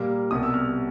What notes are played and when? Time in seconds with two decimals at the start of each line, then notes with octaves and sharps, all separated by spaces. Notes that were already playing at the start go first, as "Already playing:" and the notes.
Already playing: A#2 G3 A#3
0.31 C2 B2 G3 B3 D#6
0.43 E6
0.54 F6